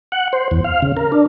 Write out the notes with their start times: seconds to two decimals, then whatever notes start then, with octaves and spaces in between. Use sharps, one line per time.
0.12 F#5
0.33 C5
0.51 E2
0.64 F5
0.82 C#3
0.97 A#4
1.12 D4